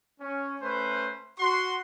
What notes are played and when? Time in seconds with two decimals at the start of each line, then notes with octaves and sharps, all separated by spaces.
0.20 C#4
0.61 A3 C#4 B4 C5
1.39 F#4 C6